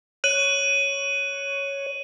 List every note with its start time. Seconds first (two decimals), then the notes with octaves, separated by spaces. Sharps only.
0.24 C#5 F#6 D#7 F#7